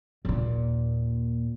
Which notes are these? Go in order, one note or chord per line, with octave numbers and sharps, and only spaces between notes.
D#2 A#2